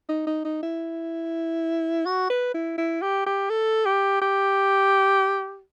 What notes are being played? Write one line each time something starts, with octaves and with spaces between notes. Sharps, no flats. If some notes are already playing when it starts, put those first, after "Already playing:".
D#4
D#4
D#4
E4
F#4
B4
E4
E4
G4
G4
A4
G4
G4